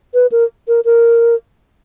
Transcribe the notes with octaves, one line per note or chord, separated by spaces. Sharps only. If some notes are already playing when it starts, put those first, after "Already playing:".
B4
A#4
A#4
A#4